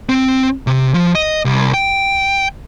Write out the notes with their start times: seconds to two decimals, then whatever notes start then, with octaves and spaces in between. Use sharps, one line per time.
0.09 C4
0.67 C3
0.94 F3
1.15 D#5
1.45 C2
1.74 G5